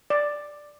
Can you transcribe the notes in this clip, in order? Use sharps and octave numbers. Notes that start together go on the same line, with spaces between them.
D5